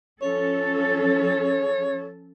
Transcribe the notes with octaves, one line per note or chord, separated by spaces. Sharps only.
F3 C#4 A4 C#5